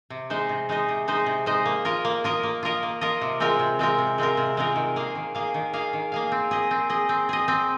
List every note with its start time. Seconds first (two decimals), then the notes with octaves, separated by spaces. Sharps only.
0.10 C3
0.30 G#3 D#4 C5 D#5
0.49 C3
0.69 G#3 D#4 C5 D#5
0.89 C3
1.08 G#3 D#4 C5 D#5
1.26 C3
1.46 G#3 D#4 C5 D#5
1.66 A#3
1.85 F4 A#4 D#5
2.05 A#3
2.24 F4 A#4 D#5
2.43 A#3
2.63 F4 A#4 D#5
2.83 A#3
3.01 F4 A#4 D#5
3.21 C3
3.40 G#3 C4 F4 A#4
3.59 C3
3.79 G#3 C4 F4 A#4
3.98 C3
4.18 G#3 C4 F4 A#4
4.37 C3
4.57 G#3 C4 F4 A#4
4.76 D#3
4.96 A#3 G#4 F5
5.15 D#3
5.35 A#3 G#4 F5
5.54 D#3
5.73 A#3 G#4 F5
5.93 D#3
6.12 A#3 G#4 F5
6.32 C4
6.51 G#4 D#5
6.71 C4
6.90 G#4 D#5
7.09 C4
7.29 G#4 D#5
7.48 C4